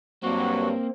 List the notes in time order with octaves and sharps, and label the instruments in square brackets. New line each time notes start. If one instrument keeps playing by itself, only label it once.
[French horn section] G2 F#3 [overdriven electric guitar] A#3 [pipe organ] C4 [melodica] F#4